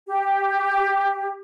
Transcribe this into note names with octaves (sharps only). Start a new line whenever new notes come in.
G4